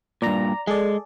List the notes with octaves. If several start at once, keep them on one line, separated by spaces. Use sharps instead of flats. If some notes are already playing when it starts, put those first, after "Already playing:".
G2 A#2 D5 A#5
G#3 G#4 A4 D5